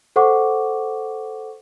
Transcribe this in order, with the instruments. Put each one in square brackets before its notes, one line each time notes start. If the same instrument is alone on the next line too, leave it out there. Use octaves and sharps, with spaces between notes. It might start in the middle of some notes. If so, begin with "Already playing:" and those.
[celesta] A4 C5 F#5 C#6 D6